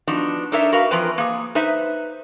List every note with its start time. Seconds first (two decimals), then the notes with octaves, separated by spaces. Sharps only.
0.08 F3 B3 D4 D#4 F#4
0.52 D4 D#4 A4 A#4 C#5 E5
0.72 F#4 A#4 B4 F5
0.91 E3 F3 C4 A#4 B4
1.18 A#3 G#4
1.55 D#4 B4 C5 E5